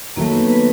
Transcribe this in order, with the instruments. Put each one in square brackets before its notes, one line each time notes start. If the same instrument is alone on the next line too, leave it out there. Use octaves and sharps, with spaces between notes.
[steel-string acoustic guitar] D#3 F#3 A3 [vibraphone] A#3 A#4
[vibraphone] B3 B4
B3 B4